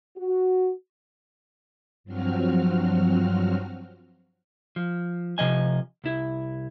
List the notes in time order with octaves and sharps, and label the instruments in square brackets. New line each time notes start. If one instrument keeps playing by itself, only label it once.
[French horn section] F#4
[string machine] G2 F3 F#3 C4 F#4 F6
[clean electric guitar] F3
C3 F3 D#5 G#5
C2 E4